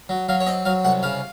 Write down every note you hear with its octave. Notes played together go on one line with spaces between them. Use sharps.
F#3
F#3 F5
C#5
C4 D#5
F#3 F5
C2 F#5
C#3 F5